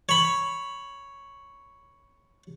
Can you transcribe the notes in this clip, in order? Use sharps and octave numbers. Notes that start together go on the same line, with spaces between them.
C#5 B5